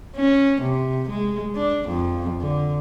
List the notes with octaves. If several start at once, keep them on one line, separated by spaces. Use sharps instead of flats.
C#4
C3
G#3
D4
F2
D3